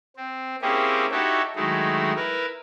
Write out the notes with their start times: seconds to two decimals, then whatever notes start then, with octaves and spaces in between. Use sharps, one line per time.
0.17 C4
0.62 A#3 C4 C#4 E4 G4 G#4
1.11 D#4 E4 F#4 G4 A4 C#5
1.56 D#3 F#3 G#3 A3 D#4 E4
2.16 E4 A#4 B4